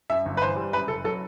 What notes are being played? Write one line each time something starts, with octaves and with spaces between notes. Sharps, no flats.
F#2 E5
G1
B4
E3 C5
G3
F#2 B4
F#1 A4
F#3 A4